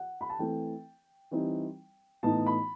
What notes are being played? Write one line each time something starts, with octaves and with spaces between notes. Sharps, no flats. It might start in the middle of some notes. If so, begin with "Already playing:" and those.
Already playing: F#5
B5
A5
E3 A3 C4 G5
E3 G3 C4 D#4
A2 E3 B3 D#4 A5
B5